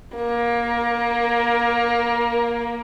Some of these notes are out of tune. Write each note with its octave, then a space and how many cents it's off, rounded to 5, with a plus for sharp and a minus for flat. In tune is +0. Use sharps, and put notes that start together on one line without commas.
A#3 +20